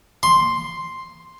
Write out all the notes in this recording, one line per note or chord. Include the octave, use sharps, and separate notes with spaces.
C6